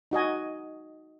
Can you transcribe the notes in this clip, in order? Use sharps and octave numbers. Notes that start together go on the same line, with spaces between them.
D#4 F#4 D#5 G#5